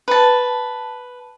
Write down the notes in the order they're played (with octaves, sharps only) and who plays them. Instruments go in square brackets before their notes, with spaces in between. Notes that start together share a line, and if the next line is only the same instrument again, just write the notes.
[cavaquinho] B4 A5